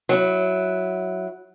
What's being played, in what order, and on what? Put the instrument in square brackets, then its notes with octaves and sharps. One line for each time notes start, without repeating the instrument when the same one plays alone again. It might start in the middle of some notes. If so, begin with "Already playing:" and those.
[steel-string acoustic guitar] F#3 E4